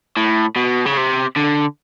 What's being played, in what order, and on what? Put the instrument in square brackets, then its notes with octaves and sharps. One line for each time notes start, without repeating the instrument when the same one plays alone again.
[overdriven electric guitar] A2
B2
C#3
C3
D3